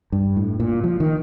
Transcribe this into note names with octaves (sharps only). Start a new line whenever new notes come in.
G2
A2
A#2
F3
D#3